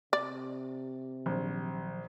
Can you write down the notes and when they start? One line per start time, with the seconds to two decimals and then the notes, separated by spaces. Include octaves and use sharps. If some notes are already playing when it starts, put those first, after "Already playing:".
0.13 C3 D5
1.26 A#1 D#3 F3 F#3